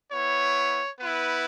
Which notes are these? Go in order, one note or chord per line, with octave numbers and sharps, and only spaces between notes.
B3 E4 C#5
B3 E4 B4